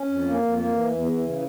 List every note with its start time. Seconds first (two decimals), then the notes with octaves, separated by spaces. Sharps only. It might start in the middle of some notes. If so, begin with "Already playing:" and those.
Already playing: C#4
0.09 F2
0.26 A#3
0.43 F2
0.58 A#3
0.75 E3
0.92 E2
1.08 E3
1.25 C#3